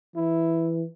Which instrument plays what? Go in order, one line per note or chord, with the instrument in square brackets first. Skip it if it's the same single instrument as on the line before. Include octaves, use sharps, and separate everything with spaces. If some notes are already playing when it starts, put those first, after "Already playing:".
[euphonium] E3 [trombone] E4